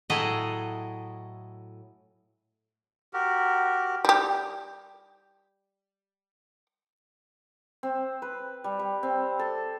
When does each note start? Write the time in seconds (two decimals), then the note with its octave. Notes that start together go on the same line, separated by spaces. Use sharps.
0.10 A2 F#3 E4 G#4 A4 D#5
3.13 F#4 G4 A#4
4.05 G3 G4
7.83 C4
8.22 B4
8.64 G3
8.79 G3
9.03 C4
9.39 A4